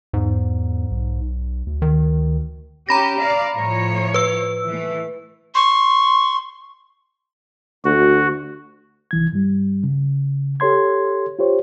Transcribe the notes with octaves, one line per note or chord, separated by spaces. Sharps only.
E2 G#2
B1
D2
D#3
C#4 G4 A#5 B5 A#6
D5 F5
A2 F3 C#5
B4 E6
E3 A3
C6 C#6
D2 F#4
C2 E3 G#6
G2 G3
C#3
G4 A4 C#5 C6 G#6
F4 G4 C5 C#5